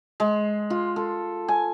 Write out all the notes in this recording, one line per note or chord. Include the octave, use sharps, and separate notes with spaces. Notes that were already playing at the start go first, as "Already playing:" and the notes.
G#3
F4
A4
G#5